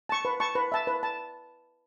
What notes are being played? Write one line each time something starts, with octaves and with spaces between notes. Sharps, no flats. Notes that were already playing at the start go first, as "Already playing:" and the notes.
A5 C#6
B4
A5 C#6
B4
E5 A5
B4
A5